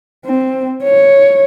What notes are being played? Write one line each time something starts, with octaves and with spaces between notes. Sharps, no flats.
C4
C#5